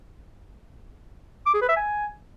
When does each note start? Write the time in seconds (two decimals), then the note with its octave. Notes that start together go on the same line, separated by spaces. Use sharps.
1.46 D6
1.54 G#4
1.61 B4
1.69 E5
1.76 G#5